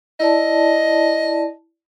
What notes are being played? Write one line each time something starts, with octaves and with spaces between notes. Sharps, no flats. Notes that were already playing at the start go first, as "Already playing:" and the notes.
E4 D5 D#5 A5